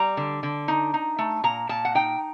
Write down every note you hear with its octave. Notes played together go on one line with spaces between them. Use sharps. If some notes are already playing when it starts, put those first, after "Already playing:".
Already playing: G3 A#5
D3
D3
D#4
D#4
A3
A#2 A#5
A#2 A5
F#5
D#4 G5